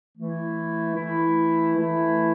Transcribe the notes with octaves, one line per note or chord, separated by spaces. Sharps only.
E3 A3 E4
E3 A3 E4
E3 A3 E4